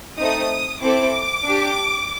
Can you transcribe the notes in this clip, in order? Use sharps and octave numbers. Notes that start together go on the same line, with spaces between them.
A3 C4 D#4 D#6
C4 E4 A4 D6
D4 G4